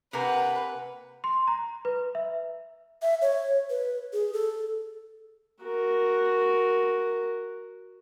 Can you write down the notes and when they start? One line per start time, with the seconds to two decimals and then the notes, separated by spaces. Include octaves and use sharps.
0.13 C3 A#3 A#4 B4 F#5 G#5
1.24 C6
1.47 A#5
1.85 B4
2.15 E5
3.02 E5
3.22 C#5
3.70 B4
4.13 G#4
4.33 A4
5.64 F#4 A#4